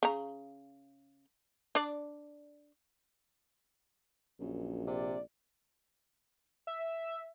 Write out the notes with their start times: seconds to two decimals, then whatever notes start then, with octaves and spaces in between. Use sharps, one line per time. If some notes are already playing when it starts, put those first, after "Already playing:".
0.03 C#3 A#5
1.75 D4 D5
4.40 A#1 F#2
4.87 C3 D5
6.67 E5